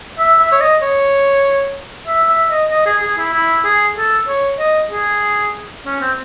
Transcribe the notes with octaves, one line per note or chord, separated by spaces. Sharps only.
E5
E5
C#5
D#5
C#5
E5
E5
D#5
D#5
G#4
G#4
E4
E4
G#4
A4
C#5
D#5
G#4
C#4
C4